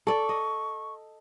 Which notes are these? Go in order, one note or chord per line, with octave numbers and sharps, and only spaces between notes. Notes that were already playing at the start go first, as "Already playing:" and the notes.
A4 D5 C#6
D#5